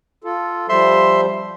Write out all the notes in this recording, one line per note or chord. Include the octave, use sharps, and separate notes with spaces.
F4 A4
F3 G3 C5 E5 C6